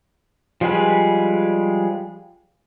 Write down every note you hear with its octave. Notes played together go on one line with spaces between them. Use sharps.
F3 G3 G#3 G#4 B4